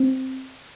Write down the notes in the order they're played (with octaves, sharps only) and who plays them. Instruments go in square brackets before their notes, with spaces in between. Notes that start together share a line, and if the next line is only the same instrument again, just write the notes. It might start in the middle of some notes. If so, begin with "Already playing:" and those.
Already playing: [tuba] C4